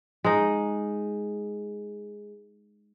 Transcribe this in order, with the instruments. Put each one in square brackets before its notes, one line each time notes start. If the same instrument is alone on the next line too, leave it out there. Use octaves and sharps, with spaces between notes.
[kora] G#3 D#4